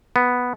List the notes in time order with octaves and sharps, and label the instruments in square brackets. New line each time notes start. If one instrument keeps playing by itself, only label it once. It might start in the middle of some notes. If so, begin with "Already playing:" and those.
[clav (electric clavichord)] B3